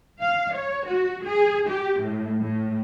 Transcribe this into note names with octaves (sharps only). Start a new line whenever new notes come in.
F5
C#5
F#4
G#4
G4
A2
A2